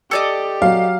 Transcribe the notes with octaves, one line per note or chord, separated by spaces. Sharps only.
G4 A4 D5 D#5
F#3 F5